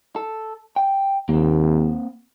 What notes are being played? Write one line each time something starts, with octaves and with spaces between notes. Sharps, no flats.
A4
G5
D#2 A#3 C4